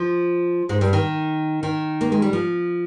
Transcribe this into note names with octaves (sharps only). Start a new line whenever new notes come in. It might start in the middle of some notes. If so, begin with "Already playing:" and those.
Already playing: F3
G#2 G#3
G2 G3
D#3
D#3
A#3
G#3
G3
F3